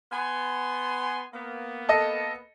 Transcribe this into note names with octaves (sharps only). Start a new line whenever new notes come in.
B3 G#5 C6
A#3 B3
A4 D#5